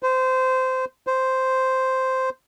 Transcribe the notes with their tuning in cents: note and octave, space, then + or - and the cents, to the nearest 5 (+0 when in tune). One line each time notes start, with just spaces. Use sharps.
C5 -20
C5 -5